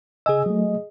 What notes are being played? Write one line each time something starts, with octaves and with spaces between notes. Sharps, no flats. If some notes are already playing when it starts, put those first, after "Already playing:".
C#3 G#4 D#5 G#5 E6
F#3 A3